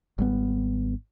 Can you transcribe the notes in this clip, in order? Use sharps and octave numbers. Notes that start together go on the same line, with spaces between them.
G#1 G3 B3